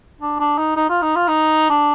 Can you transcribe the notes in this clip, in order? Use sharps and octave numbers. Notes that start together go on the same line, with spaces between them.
D4
D4
D#4
D#4
F4
D#4
F4
D#4
D4